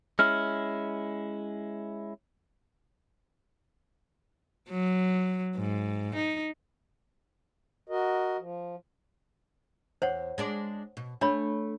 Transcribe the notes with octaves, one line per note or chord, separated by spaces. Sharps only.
G#3 C#4 E4 F6
F#3
G#2
D#4
F#4 A#4 D#5
F3
E2 C5 C#5 F#5
G#3 D4 D5
B2
A3 D4 C#5 B5